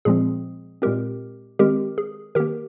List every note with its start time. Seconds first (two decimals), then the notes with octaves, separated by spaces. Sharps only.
0.05 A#2 F3 G#3 C4 G#4
0.82 A#2 G#3 C4 G4 A#4
1.59 D#3 G#3 C4 G4 A#4
1.98 G#4
2.35 D#3 A#3 G4 A#4